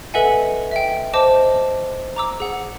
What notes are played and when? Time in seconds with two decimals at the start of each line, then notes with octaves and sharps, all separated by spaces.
0.14 A4 B4 D#5 E5 F#5 G#5
0.71 E5 G5
1.13 C5 D#5 A5 D6
2.16 A#5 D6 E6
2.40 G#4 F#5